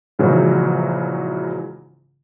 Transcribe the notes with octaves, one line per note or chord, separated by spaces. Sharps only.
A#1 G#2 C#3 E3 F#3